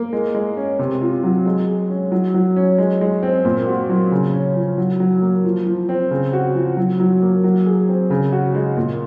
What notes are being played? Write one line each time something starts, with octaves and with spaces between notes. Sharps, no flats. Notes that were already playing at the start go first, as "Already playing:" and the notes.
Already playing: A#3
G#3
G#3
C#4
C3
F4
F#3
G#3
G#4
C#4
F#3
F#3
C#4
G#3
G#3
C4
A#2
F#4
F#3
C#3
C#4
F3
F#3
F#3
A#3
F3
F3
C4
C#3
F#4
F3
F#3
F#3
A#3
F#3
G#4
C4
C#3
F#4
G#3
A#2